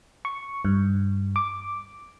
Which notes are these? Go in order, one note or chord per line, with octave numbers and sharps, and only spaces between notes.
C#6
G2
D6